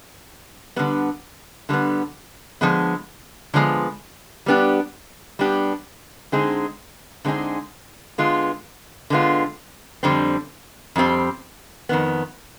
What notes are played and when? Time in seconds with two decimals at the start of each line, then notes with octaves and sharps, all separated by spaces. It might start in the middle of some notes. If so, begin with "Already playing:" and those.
0.76 D3 G3 B3
1.69 D3 G3 B3
2.61 D3 F3 G#3 B3
3.54 D3 F3 G#3 B3
4.46 G3 B3 D4 G4
5.39 G3 B3 D4 G4
6.32 D3 G#3 C4 D#4 G#4
7.25 D3 G#3 C4 D#4 G#4
8.18 D3 G#3 B3 F4
9.10 D3 G#3 B3 F4
10.03 F2 D3 G3 C4
10.96 F2 D3 G3 C4
11.89 F2 D#3 B3